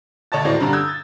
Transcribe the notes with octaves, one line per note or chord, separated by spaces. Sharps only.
D2 C#5 D#5 A5 A6
G#1 A2 F#3 C5 D5 A#6
G2 D3 D4 A#5
D#6 E6 G6 G#6
A6